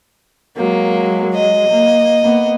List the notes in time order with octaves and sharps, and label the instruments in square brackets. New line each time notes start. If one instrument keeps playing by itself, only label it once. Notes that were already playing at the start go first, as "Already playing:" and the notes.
[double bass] F#3 G#3 [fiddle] A#3
[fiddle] D#5
[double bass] A#3
A#3 B3